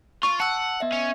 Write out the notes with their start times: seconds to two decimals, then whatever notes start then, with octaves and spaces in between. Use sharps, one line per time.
0.23 F4 C#6
0.40 F#5 A5 E6
0.80 B3 D#5 E5
0.92 C#4